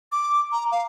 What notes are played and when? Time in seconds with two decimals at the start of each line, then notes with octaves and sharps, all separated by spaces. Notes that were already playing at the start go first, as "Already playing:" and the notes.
0.12 D6
0.52 A#5
0.72 F5